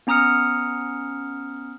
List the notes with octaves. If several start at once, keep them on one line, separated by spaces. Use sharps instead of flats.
B3 C#4 A#5 D#6 F6 C#7